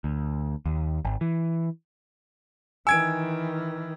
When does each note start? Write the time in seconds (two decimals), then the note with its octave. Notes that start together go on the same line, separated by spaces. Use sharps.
0.04 D2
0.66 D#2
1.05 G#1
1.21 E3
2.87 D#3 E3 G#5 E6 G#6 D7